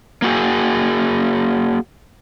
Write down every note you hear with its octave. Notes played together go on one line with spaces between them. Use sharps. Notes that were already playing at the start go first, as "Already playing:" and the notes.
A#3 F#4 G#4